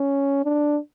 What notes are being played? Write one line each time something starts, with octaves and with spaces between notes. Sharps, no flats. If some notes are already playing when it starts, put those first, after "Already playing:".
Already playing: C#4
D4